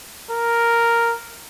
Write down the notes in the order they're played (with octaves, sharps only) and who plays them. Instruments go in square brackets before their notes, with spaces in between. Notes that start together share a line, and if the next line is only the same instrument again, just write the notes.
[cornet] A#4